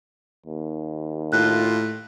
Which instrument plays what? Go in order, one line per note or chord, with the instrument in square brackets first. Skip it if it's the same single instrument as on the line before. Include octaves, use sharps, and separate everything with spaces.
[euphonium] D#2
[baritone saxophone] A2 [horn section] F4 [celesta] F#6